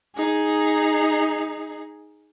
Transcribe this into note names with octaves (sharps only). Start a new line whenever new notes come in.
D#4 G#4